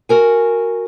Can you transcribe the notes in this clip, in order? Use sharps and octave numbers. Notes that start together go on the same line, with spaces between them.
F#4 A#4 G#5